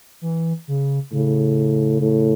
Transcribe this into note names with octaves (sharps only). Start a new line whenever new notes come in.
E3
C#3
A2 C#3
A2